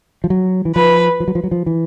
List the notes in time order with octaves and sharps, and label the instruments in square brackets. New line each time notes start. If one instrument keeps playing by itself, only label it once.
[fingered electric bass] F3
F#3
E3
[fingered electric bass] F3 [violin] B4
[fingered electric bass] F3
F#3
F3
F#3
F3
E3